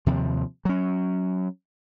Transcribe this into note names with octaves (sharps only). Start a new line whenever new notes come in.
D#2 C3 F3
F#3 C#4